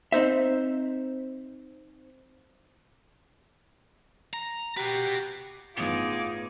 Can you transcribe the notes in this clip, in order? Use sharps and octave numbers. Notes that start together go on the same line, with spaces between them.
C4 D#4 C5 E5
A#5
F#4 G4 B4
G1 A2 B3 D#4 F4 G#4 D6